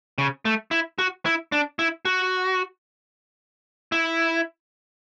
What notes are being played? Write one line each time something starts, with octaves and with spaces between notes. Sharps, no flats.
C#3
A3
E4
F#4
E4
D4
E4
F#4
E4